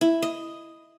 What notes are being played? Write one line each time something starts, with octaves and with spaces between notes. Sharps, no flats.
E4
D#5